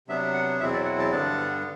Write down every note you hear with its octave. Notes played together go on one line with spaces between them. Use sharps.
C3 F#3 B3 D4 E5
F#5
E2 B2 F#3 C4 E4 E5
D5
F#5
A5
G2 D3 G3 B3 D4 A5